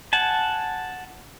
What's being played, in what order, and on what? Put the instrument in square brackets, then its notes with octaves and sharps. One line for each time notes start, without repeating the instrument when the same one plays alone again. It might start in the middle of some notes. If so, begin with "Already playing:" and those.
[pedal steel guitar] F#5 G#5 A5